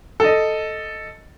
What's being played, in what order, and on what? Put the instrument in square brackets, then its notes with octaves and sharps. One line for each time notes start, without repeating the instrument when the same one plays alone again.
[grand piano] A4 D#5